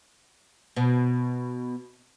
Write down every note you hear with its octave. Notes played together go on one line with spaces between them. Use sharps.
B2